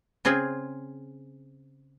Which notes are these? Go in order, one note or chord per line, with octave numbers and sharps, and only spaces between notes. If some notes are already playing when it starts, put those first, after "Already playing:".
C#3 C4 F4 G#4